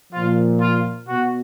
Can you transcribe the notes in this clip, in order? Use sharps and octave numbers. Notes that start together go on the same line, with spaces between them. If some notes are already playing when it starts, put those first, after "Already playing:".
A#2 F3 F4
F4
B2 F#4